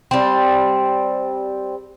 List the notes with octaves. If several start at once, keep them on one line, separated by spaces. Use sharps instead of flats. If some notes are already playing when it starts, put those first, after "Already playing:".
G3 C4